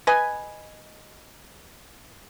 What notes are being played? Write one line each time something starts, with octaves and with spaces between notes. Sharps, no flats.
B4 D#5 G#5